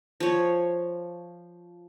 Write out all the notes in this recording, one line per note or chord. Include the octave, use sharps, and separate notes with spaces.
F3 C#5